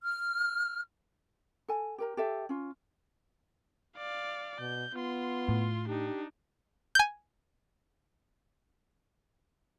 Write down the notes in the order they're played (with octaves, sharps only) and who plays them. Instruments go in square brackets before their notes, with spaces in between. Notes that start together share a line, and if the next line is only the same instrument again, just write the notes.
[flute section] F6
[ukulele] A4 G#5
G4 A#4 A#5
G4 A4 E5
C#4 F4
[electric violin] D5 F5
[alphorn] B2 [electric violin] G6
[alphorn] B3 [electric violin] F4 C6
[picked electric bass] A2
[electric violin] D4 D#4 [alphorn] G4
[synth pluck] G#5 G6